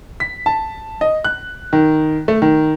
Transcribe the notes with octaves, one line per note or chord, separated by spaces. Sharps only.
B6
A5
D#5
F#6
D#3
A3
D#3